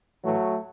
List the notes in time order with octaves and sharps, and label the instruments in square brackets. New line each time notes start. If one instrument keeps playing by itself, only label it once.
[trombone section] A2 E3 F#3 A3